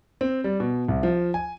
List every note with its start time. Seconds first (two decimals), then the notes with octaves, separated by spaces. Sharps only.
0.21 C4
0.44 G3
0.60 B2
0.88 C2
1.03 F3
1.34 G#5